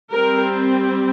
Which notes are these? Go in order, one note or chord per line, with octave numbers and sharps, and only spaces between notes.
G3 C4 A#4